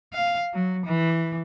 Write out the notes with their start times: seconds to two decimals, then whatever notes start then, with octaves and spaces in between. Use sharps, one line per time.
0.13 F5
0.54 F#3
0.86 E3